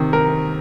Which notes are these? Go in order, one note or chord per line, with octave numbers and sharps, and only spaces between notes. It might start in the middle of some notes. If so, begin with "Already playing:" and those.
Already playing: C3 D#3
A#4